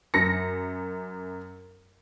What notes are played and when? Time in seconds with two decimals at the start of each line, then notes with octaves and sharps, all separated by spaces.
0.14 F#2 A#6 C#7